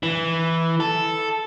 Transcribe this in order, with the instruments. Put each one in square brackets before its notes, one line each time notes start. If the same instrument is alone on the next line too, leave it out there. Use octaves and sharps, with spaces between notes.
[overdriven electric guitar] E3
A4